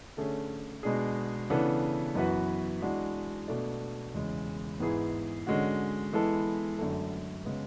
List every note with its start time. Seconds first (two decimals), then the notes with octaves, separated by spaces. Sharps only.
0.17 D3 A3 C#4 G#4
0.83 B2 G#3 D4 G#4
1.50 C#3 E3 B3 D4 A4
2.15 F#2 E3 B3 F#4 B4
2.82 E3 G#3 D4 F#4
3.48 B2 A3 D4 A4 D5
4.14 E2 C#3 G#3
4.80 G#2 E3 B3 E4 G#4
5.47 D3 G#3 C#4 F#4
6.13 E3 G#3 B3 E4 A4
6.78 F#2 D3 A3
7.45 C#3 G#3 B3